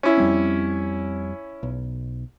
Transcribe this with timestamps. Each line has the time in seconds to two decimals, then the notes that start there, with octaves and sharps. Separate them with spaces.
0.03 C#4 E4
0.18 F2 G3 C4
1.63 B1